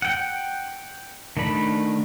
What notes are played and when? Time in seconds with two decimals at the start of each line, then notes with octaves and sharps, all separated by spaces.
0.02 F#5 G5
1.37 D#3 A3 D4 B5